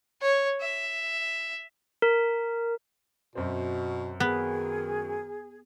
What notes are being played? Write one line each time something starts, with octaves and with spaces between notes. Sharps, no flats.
C#5
E5
A#4
F#2 B2 C4
D#3 B3 G#4